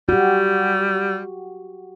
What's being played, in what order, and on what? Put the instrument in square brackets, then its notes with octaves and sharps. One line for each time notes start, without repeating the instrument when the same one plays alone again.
[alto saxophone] G3 [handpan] F#4 G4